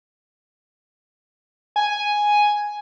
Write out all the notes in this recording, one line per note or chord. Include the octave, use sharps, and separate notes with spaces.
G#5